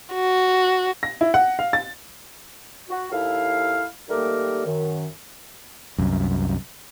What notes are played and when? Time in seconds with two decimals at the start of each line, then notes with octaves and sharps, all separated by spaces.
0.14 F#4
1.03 A#6
1.21 E4
1.34 F#5
1.59 F5
1.73 A6
2.89 F#4
3.12 D#2 E4 A4 F5
4.09 D#3 G3 A3 A#3 G4 A#4
4.66 F#2 D#3
5.98 C2 F#2